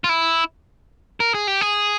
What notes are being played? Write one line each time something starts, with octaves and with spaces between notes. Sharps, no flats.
F4
E4
A#4
G#4
G4
G#4